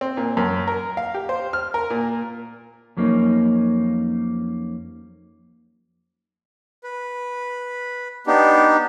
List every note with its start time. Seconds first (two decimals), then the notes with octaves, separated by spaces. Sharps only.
0.01 C4
0.17 A#2
0.37 F#2
0.68 A#4
0.97 F5
1.14 G4
1.29 C5
1.53 F6
1.74 A#4
1.90 A#2
2.97 F2 F#3 A#3 C#4 D#4
6.84 B4
8.27 B3 D4 D#4 G4